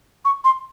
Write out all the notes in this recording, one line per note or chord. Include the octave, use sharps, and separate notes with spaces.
C#6
C6